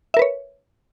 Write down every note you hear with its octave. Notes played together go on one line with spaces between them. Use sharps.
A#4 B4 C#5 E5